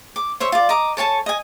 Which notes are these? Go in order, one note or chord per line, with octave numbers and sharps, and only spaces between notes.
D6
C5 C#5 E5
F4 D5
D#5 A#5 D6
A4 C#5 G#5 A5
D#5 G#5